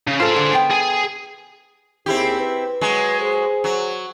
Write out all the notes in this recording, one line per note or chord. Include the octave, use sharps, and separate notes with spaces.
C#3
F4 G#4 A4 C5
D3
B3 G5
G#4 G#5
D#2 C4 E4 G4 G#4
B4
F#3 G#3
G#4 C5
F#3